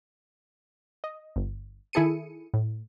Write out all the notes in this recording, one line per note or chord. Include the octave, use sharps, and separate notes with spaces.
D#5
G1
D#3 E4 G#4 A4 C#7 D#7
A2